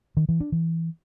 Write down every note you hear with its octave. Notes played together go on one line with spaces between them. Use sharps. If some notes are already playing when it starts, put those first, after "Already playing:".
D#3
E3
D4
E3